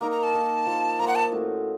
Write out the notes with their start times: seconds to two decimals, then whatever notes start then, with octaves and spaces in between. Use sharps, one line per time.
0.01 A#3 D#4 A#4 A#5
0.11 A#5
0.23 A5
0.33 A#3 D#4 A#4
0.66 F3 A#3 F4
0.99 F3 A#3 F4 A#5
1.08 F#5
1.15 A5
1.32 A2 A3 C#4 F#4